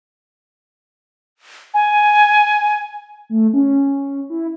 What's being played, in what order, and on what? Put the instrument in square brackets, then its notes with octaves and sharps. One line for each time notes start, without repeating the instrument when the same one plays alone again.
[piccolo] G#5
[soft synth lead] A3
C#4
E4